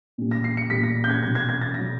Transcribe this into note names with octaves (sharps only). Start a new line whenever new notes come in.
A#2 G3
A#6
C7
C#7
A#2 G3 B6
A#6
G6
G#6
B2 F#3 G#6
G#6
G#6
A6
B2 F#3 A#6